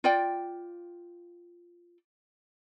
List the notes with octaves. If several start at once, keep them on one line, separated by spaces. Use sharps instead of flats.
F4 D5 G5